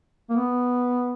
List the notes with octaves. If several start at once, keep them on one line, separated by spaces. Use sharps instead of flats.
A#3
B3